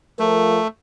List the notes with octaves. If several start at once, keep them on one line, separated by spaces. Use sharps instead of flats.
F3 A3 A#4